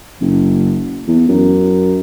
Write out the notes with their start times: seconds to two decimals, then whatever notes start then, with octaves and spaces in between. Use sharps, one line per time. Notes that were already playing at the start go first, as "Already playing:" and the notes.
0.21 F#1
1.08 E2
1.28 F#2